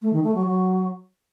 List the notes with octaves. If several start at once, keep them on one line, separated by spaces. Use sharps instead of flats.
A3
D#3
A3
F#3
F#3